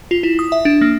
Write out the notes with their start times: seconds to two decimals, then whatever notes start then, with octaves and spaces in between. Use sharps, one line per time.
0.11 F4
0.23 E4
0.39 D#6
0.52 E5
0.65 D4
0.81 A#3